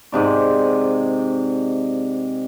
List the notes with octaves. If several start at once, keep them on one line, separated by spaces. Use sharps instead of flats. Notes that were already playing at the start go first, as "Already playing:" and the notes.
G#2 C3 D5